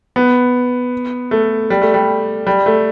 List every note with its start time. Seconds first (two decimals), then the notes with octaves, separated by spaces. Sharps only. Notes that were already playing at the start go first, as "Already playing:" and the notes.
0.16 B3
1.31 A3
1.70 G3
1.82 A3
1.94 G3
2.47 G3
2.66 A3